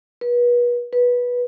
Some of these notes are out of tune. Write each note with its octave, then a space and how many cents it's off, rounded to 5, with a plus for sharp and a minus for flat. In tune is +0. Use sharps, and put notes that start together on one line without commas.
B4 -35
B4 -15